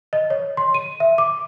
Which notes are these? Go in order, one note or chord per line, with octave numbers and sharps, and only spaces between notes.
D#5
C#5
C6
D#7
E5
D6